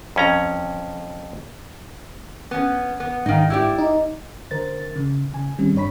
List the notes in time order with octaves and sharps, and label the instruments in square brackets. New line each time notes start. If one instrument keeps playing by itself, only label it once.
[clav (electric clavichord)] F2 C#4 A#5
[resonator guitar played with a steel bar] B3 C#4
B3
[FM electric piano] G#2 F5 [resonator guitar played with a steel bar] D#3 D#4
[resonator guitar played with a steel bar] E4 G4 D5
[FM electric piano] D#4
D3 A#4 C5 A6
C#3
C#3 G#5
D#3 G3 G#3 C4 C#4
G2 D4 C#5 B5 B6